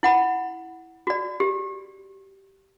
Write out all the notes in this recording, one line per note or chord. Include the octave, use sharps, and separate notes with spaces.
E4 F#5 B5
F#4 D5
G4